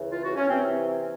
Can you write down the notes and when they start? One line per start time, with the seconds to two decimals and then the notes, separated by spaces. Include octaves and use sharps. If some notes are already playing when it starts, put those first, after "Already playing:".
Already playing: C#2 C#3 E3
0.09 F4
0.22 F#4
0.36 C#4
0.49 C3 E3 C4